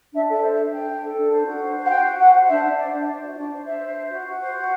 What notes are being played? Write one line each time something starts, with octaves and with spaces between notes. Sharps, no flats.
D4 E5
A4 E5
C5
E5
C5
C5 G5
D4
A4
D4
C5
F#4
C5
C5
F#5
F#4 G5
F#4
C5 F#5
C5
D4 E5
D4
C5 D5
D4
E5
C5 D5
F#4
D4 D5
C5
C5 E5
C5
C5
F#4
F#4
C5
F#4